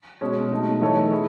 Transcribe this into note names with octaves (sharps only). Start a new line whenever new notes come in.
B2 G#3 C#4
B2 A3 D#4
E3 A3 D#4 A4 C#5
E4 G#4